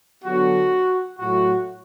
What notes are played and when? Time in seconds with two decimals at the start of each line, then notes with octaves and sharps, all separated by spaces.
0.23 D3 F#3 B3 F#4
1.19 A2 F#3 A3 F#4